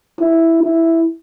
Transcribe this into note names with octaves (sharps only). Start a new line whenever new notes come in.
E4
E4